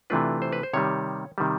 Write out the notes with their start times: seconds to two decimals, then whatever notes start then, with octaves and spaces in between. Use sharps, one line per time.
0.10 C3 E3 A3 D4 F4 B4
0.42 C5
0.52 B4
0.63 C5
0.73 C3 D#3 G3 C#5
1.38 C3 D#3 G3